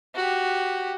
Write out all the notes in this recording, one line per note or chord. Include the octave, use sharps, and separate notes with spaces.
F#4 G4